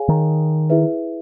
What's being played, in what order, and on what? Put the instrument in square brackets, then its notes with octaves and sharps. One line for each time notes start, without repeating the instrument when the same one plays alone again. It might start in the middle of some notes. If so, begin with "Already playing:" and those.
Already playing: [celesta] G#4 C#5 F5 G#5
[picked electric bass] D#3
[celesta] E4 G#4 B4 E5